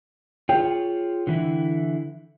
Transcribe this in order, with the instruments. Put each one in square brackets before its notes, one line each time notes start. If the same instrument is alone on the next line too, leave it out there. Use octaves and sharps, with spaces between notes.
[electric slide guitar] F4 G#4 C#5 [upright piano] G5
[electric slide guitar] D3 E3 E4